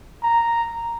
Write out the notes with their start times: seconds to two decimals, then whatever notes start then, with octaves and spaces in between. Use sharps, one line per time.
0.23 A#5